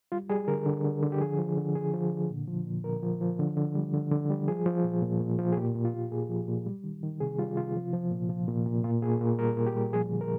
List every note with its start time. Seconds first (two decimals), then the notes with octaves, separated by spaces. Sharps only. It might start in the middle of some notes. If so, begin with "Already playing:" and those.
0.12 G3 F4
0.29 G3 G#4
0.48 D3 A#4
0.66 D3
0.84 D3
1.02 D3
1.12 G4
1.20 F3 G#4
1.39 F3
1.57 D3
1.75 D3 G#4
1.93 F3
2.12 D3
2.30 A#2
2.48 F3
2.66 A#2
2.84 A#2 A#4
3.03 F3
3.21 F3
3.39 D3
3.57 D3
3.75 G3
3.93 D3
4.12 D3
4.30 G3
4.48 F3 G#4
4.66 F3
4.84 A#2
5.02 A#2
5.20 A#2
5.38 F3
5.52 G#4
5.57 A#2 G4
5.75 A#2
5.85 F4
5.94 A#2
6.12 A#2 G#4
6.29 F3
6.48 A#2
6.66 G3
6.84 D#3
7.03 D#3
7.20 C3 G#4
7.39 G3 F4
7.57 C3 F4
7.75 F3
7.93 F3
8.11 A#2
8.29 F3
8.48 A#2
8.66 A#2
8.84 A#2 F4
9.02 A#2 G#4
9.21 A#2 A#4
9.39 G3 A#4
9.57 A#2
9.66 G4
9.75 G3
9.93 F3 G#4
10.11 D3
10.21 A#4